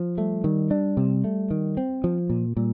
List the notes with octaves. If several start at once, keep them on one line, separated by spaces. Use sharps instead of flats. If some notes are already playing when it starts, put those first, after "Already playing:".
Already playing: F3
G3 A3
D#3 G3
G3 D4
C3 G3
A3
D#3
C4
F3
A#2
A#2 G3